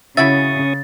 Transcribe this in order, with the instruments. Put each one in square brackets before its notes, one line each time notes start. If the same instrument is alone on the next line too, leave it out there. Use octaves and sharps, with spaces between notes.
[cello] C#3 [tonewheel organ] C#4 C#6 D#6 [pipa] E4 F#4 E5 [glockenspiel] A6